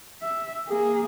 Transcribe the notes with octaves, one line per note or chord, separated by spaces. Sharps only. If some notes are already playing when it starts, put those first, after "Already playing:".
E5
A#3 G#4